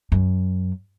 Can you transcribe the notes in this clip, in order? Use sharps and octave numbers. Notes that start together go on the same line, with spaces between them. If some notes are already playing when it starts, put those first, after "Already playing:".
F#2